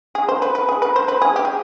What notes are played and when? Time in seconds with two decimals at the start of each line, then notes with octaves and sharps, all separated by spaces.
0.15 G#4
0.29 C5
0.42 B4
0.55 B4
0.69 G#4
0.82 B4
0.96 C5
1.08 B4
1.22 G#4
1.36 G4
1.45 G#4